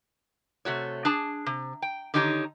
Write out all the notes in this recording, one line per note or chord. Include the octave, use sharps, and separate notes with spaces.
C3 A3 F#4 C#5
D4 G#4 A5
C3
G5
D3 D#3 D#4 G4 C#5